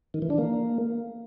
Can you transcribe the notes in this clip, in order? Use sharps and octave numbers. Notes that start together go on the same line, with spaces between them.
D#3
E3
D4
A#3